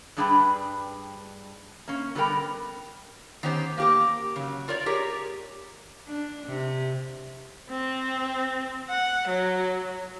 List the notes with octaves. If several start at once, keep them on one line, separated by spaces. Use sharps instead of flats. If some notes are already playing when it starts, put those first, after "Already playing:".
G2 G3 D4 G#4 B4 G5
A#3 C#4
D3 F#3 G3 B3 A#4 G5
D#3 B3 C#4 G4 C5
A#3 G4 A#4
C#3 F#3
F4 A#4 C#5 D5
G4 G#4 A#4 C#5
D4
C3
C4
F#5
F#3